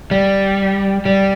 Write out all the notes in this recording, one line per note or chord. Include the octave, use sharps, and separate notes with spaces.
G3
G3